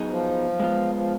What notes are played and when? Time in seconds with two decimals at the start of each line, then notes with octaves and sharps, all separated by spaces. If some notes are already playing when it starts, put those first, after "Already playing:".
Already playing: F#3 B3 D#4 G#4
0.09 F3
0.60 G#3 B3 F4
0.95 F3